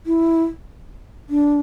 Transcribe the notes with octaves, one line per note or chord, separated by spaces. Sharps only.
E4
D4